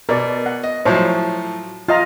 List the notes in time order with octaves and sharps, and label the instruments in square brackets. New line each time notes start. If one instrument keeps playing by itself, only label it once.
[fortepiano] B2 [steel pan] A#4 D5
[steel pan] F#5
[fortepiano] D#5
[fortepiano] A2 F3 F#3 [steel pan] C5 C#5 A5
[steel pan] F4 D#5 A#5 [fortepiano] F5